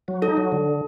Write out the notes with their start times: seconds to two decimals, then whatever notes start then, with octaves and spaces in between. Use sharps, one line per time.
0.08 F#3
0.22 D#4 A4
0.37 F#3
0.52 D3